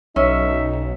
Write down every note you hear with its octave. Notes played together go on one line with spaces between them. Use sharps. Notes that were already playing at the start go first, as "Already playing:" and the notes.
B1 C#4 D#4 E5